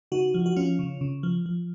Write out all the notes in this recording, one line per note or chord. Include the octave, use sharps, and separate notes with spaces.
C#3 D#4 F#4
F3
F#4
F3 C#4 F4
C#3
C#3
F3
F3